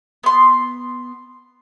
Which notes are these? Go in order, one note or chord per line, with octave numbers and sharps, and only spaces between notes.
B3 C6